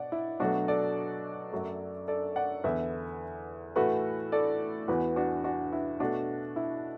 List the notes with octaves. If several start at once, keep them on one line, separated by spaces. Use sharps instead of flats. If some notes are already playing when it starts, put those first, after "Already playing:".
Already playing: B2 D5 F#5
E4
B2 F#3 A3 D4 F#4
A4 D5
F#2 F#3 A3
A4 D5
D5 F#5
E2 D3 B3 B4 E5
A2 E3 A3 F#4 B4
A4 D5
E2 E3 B3 F#4 B4
D4 F#4
D4 F#4
E4
B2 A3 D4 F#4
E4